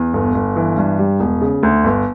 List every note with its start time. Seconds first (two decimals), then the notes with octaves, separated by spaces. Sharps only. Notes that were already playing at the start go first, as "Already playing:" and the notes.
Already playing: E2
0.14 G1
0.35 G1
0.56 E3
0.77 G2
0.99 G3
1.20 E1
1.41 C#3
1.63 D2
1.84 G1